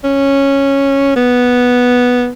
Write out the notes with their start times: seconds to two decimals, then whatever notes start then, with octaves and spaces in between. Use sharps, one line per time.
0.04 C#4
1.16 B3